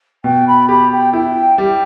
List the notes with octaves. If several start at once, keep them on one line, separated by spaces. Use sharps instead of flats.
B2 G5
B5
G4 B5
G5
E4 G5
G3 G5